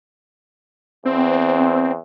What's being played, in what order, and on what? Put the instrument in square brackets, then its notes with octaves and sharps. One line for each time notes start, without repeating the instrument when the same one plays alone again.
[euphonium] E2 [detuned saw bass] C4